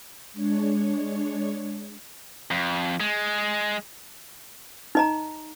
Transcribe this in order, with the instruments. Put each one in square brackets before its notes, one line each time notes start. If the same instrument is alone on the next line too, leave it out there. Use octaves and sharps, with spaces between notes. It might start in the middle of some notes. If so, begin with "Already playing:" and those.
[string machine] G#3 D4 C#5
[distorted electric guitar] F2
G#3
[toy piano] D#4 D#5 A#5